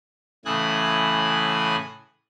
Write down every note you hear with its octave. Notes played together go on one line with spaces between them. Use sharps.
A2 C#3 E3 G#5 D#6 F#6